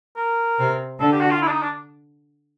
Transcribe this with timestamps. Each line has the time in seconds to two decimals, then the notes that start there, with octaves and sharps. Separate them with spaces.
0.17 A#4
0.58 C3 C4
0.99 D3 D4 A4
1.12 G4
1.21 F#4
1.31 F4
1.42 E4
1.47 D4
1.52 D#4
1.62 D4